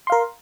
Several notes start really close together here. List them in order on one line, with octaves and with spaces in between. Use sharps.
C6 F5 A#4